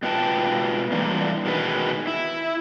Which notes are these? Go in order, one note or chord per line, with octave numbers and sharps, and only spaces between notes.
B2 G#3 F4 B4 G5 A5
D3 E3 G3 A#3
B2 D#3 G#3 B4
E4